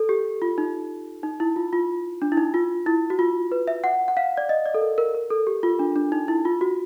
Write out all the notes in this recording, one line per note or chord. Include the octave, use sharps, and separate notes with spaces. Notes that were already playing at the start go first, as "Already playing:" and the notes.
Already playing: A4
G4
F4
D#4
D#4
E4
F4
F4
D4
E4
D#4
F4
E4
F#4
F4
B4
E5
F#5
F#5
F5
D5
D#5
D5
A4
A#4
A#4
A#4
A4
G4
F4
D4
D4
D#4
E4
F4
F#4